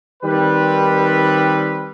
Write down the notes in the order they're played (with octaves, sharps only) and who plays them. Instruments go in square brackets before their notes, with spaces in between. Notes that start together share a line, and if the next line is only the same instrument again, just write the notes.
[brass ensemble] D#3 G3 C4 B4